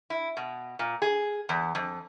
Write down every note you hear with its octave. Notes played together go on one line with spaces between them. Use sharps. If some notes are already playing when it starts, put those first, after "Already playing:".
E4
B2
A#2
G#4
E2
F2